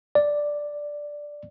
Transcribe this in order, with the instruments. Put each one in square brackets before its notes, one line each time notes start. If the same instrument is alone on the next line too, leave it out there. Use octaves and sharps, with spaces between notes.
[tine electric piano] D5